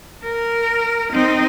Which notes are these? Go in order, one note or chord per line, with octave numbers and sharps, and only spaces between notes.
A#4
C4 D#4